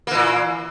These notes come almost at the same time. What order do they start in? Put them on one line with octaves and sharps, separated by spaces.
A#3 E3 A#2